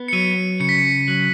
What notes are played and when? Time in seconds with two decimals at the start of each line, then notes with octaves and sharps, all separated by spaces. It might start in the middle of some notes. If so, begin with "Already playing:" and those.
Already playing: B3
0.08 C#7
0.13 F#3 D#7
0.60 C#3 C#7
0.69 B6
0.78 C#7
1.08 F#3